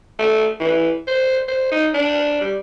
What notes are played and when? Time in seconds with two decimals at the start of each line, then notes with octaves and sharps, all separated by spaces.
0.19 A3
0.60 E3
1.07 C5
1.48 C5
1.72 D#4
1.94 D4
2.41 G3